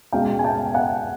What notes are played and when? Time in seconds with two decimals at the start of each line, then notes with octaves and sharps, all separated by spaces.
0.12 B2 G#3 C#4 F5 G5
0.39 G#5
0.44 G5 A5
0.74 F#5 G#5